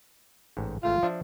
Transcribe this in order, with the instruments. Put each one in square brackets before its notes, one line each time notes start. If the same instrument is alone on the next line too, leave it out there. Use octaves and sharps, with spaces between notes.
[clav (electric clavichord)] A1 G#2
[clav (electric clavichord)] G#1 A3 F5 [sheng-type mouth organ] F4
[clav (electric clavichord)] F3 D4 E5